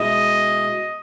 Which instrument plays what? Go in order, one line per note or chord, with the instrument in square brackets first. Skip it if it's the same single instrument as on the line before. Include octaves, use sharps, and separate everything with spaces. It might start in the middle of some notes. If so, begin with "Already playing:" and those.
Already playing: [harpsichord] B2 G#3 C#4 E4 [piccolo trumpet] D#5